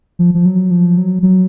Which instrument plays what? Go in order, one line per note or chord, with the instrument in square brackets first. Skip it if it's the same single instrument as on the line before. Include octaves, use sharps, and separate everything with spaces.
[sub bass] F3
F3
F#3
F3
F#3
F#3